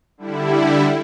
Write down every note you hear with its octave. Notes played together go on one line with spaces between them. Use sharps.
D3 G3 E4